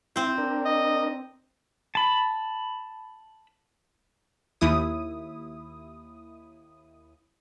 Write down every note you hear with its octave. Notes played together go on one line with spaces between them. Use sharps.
C4 E4 C5
D4 A#4
D#5
A5 B5
D#2 E4 D#6